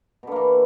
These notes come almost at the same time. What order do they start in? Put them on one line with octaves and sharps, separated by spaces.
B2 D3 A#3 E3